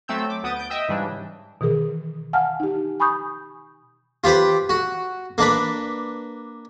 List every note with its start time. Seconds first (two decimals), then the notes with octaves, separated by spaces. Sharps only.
0.08 F#3 A3 C4 E6 G6
0.30 D6
0.43 D2 B3 D#6 G6 A6
0.56 G6 D7
0.70 D#5 E5 G5 D#6 E6
0.89 G#2 C#3 E3 G3 D4
1.61 B2 D#3 E3 G#4 A#4
2.33 F5 F#5 G#5 A5 F6
2.60 D#4 G4
3.00 G#5 B5 C#6 D#6 G6
4.24 F4 G4 B4 C5
4.69 F#4
5.38 A#3 D4 B4